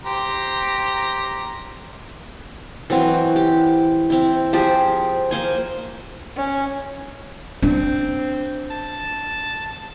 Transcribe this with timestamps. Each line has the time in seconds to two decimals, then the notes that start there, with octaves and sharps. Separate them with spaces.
0.05 G4 C5 A#5
2.90 E3 F#3 C4 F#4
3.36 G4
4.10 C4 E4
4.53 F3 G4 G#4
5.31 A#3 C5 G#5
6.36 C#4
7.62 C4 D4
8.71 A5